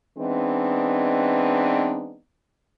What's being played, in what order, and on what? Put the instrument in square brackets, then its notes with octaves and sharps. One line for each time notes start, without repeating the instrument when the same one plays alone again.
[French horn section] E3 G#3 B3 C4 D4 D#4